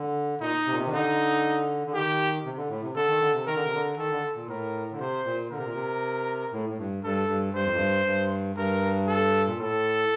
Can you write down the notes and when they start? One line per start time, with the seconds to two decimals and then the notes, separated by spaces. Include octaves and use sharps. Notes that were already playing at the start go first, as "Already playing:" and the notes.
Already playing: D3
0.40 A#2 D#4
0.66 C3
0.72 A#2
0.79 C3
0.87 D#3
0.91 D3 D#4
1.87 D3
1.93 D#3 G4
2.45 C3
2.57 D3
2.70 A2
2.83 C3
2.95 D3 A4
3.08 D#3
3.21 D3
3.34 C3
3.46 D#3 A#4
3.56 D3
3.64 C3
3.73 D3
3.97 D#3 A4
4.11 D3
4.36 A#2
4.48 A2 A#4
4.92 D3
4.99 C3 C5
5.25 A#2
5.50 D3 A#4
5.58 C3
5.66 A#2
5.74 C3
6.53 A2
6.70 A2
6.78 G2
7.04 G2 A4
7.28 G2
7.54 G2 C5
7.66 F2
7.76 G2
8.06 G2
8.56 G2 A#4
9.07 A4
9.47 A#2
9.58 A2 A4